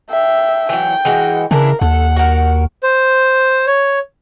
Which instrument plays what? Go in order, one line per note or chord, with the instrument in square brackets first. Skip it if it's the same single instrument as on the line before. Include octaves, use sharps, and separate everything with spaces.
[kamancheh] E5 G5
[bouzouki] E3 F#3 [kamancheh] G5
[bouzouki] E3 G#3 F#4
[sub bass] C#3 [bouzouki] E3 D4 E4 [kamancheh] A#4
[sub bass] D#2 [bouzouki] A4 [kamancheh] F#5
[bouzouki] F#4 A#4
[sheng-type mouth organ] C5
C#5